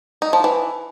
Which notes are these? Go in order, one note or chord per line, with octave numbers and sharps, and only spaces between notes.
D#4
F3
E3